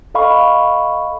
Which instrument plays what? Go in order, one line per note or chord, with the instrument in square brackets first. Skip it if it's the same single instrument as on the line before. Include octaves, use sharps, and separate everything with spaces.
[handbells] A4 D#5 F5 B5 C#6